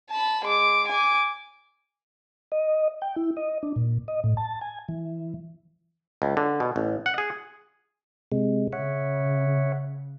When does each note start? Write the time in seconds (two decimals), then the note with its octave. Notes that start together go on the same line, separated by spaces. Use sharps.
0.11 A5 B5
0.45 G#3 D6
0.87 G#5 D6
2.52 D#5
3.02 G5
3.16 E4
3.37 D#5
3.63 D4
3.76 A#2
4.08 D#5
4.24 A2
4.37 A5
4.61 G#5
4.88 E3
6.22 C#2
6.37 D3
6.60 B2
6.76 A1
7.06 F#5
7.18 G#4
8.32 C3 G#3
8.73 C#3 C#5 E5 F#5